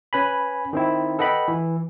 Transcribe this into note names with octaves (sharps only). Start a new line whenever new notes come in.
C#4 B4 G#5 B5
D#3 C4 E4
A4 B4 D#5 F#5 G5 B5
E3